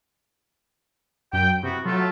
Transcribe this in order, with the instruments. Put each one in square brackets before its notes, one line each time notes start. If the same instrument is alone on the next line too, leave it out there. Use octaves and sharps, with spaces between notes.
[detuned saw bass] F#2 [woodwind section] G5
[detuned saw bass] C3 [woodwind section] B3 E4 F#4
[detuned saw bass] F#3 [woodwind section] A3 F4